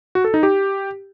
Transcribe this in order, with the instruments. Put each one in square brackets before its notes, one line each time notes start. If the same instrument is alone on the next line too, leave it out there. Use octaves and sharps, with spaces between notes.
[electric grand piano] F#4
A4
D#4
G4